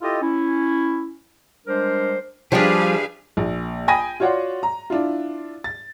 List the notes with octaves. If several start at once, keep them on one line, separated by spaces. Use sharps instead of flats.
E4 F4 G4 A4 D#5
C#4 E4
G3 G#3 D4 A#4 C5
F3 G3 D4 G4 G#4 B4 F5
A#1
G5 G#5 B5 D#6 A#6 D#7
F4 F#4 C#5 D5 F#5 C6
A#5
D4 E4 F4
A6